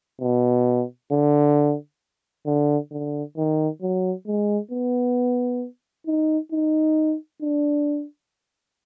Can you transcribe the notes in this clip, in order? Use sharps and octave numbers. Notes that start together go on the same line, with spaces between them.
B2
D3
D3
D3
D#3
F#3
G#3
B3
D#4
D#4
D4